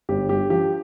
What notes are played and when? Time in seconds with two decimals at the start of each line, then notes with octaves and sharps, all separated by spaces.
0.09 G1 G4
0.29 G2 G4
0.50 F3 G4